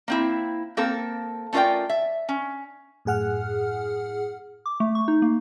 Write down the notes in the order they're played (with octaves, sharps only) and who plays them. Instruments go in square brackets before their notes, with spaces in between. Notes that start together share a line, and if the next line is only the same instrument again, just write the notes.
[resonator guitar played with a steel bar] A#3 C4 E4
A#3 C4 A4 A#4
A3 C#4 F4 A#4 D5 G5
E5
C#4
[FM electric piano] F#2 A2 G#4 F#5 F6
[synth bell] D6
A3
C#6
D#4
A#3